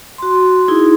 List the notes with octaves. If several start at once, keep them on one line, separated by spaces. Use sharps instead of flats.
F#4 C6
D#4 E4 G#4